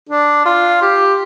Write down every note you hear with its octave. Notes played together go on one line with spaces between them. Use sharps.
D4
F4
G4